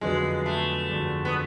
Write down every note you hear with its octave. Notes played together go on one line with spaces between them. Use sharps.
F2 D3 F#3 G#3 B3
A3
G1 F2 D3 F#3
B3